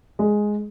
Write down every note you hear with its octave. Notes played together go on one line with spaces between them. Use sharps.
G#3